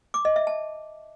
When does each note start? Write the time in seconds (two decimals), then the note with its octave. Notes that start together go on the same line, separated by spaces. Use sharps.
0.14 D6
0.25 D#5
0.36 E5
0.47 A5